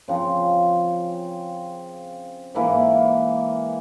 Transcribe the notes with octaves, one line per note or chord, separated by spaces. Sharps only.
C#3 F3 C4
G#2 E3 A#3 E4